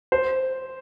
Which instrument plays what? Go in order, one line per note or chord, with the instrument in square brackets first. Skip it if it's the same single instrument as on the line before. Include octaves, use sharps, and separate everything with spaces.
[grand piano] C5